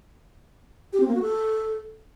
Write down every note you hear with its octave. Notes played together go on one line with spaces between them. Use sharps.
G4
C4
A#3
F#4
A4